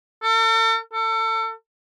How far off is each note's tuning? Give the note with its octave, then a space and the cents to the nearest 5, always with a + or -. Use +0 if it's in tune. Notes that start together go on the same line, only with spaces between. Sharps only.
A4 +45
A4 +30